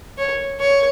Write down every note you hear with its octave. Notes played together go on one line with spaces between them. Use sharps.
C#5
C#5